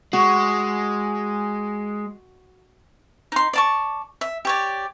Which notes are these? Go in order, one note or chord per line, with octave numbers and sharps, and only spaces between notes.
G#3 F#4
D#4 C6
D5 A5 C#6
E5
G4 C#5 D5